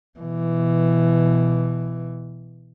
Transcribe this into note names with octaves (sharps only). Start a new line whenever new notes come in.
B2 E3